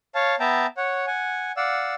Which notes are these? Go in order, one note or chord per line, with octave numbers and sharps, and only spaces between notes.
C#5 F5 A5
B3 E5 G5 A5 A#5
C#5 F#5
F#5 G#5
D5 F5 F#5 E6